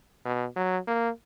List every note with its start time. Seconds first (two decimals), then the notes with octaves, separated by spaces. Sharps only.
0.25 B2
0.56 F#3
0.87 A#3